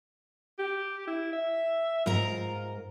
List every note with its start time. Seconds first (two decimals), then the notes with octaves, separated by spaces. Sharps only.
0.59 G4
1.08 E4
1.33 E5
2.06 G#2 F4 A#4 A#5